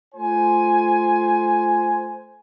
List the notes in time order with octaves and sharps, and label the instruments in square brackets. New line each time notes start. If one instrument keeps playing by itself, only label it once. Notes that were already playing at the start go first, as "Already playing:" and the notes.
[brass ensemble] A3 F4 C5 G#5